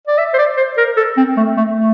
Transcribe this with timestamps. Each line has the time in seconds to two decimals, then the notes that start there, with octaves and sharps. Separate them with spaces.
0.07 D5
0.18 E5
0.34 C5
0.38 D5
0.57 C5
0.77 A#4
0.97 A4
1.17 C4
1.37 A3
1.57 A3
1.76 A3